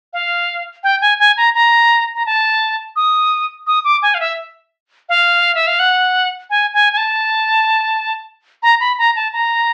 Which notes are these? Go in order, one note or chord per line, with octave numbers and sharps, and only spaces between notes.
F5
G5
G#5
G#5
A#5
A#5
A#5
A5
D#6
D#6
D6
G#5
F5
E5
F5
E5
F5
F#5
G#5
G#5
G#5
A5
A#5
B5
A#5
A5
A#5